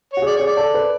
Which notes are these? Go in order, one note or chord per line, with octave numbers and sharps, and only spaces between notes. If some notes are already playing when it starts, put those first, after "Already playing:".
F#4 C#5
G#4 D5
G#4 C#5
D5
A4
B4